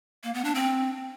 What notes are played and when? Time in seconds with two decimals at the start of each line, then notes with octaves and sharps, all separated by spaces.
0.24 A#3
0.34 B3
0.45 D4
0.55 C4